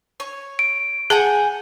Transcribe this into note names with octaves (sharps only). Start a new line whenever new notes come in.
C#5
D7
G#4 F#5 G#5 A5 G6